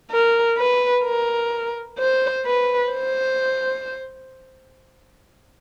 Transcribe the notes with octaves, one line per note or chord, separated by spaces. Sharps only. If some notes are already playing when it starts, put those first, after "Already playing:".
A#4
B4
A#4
C5
B4
C5